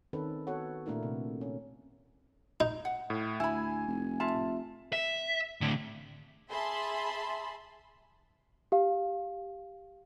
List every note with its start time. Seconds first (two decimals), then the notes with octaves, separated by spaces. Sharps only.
0.13 D#3 C4 C#4 A4 B4
0.47 B3 F#4 A4 C#5 F#5
0.86 A#2 A3 A#3 D4 E4 A#4
1.03 C3
1.41 C#4
2.60 D#4
2.85 F#5
3.10 A2
3.40 D2 E4 G#5 B5
3.88 F1
4.20 F4 E5 A5
4.93 E5
5.61 A2 D3
6.51 G#4 E5 A5 B5 C6
8.72 G4 F5